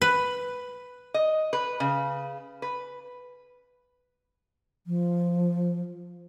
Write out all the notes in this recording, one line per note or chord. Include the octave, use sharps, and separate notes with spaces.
B4
D#5
B4
C#3
B4
F3